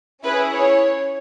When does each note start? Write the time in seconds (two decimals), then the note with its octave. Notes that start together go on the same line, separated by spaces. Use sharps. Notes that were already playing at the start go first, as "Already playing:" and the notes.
0.24 C#4 E4 G#4 B4
0.53 C#5